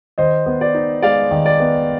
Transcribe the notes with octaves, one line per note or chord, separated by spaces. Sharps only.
D#3 C5 D#5
B3
D5
D#4
G#3 D5 F5
D#3
D5
B3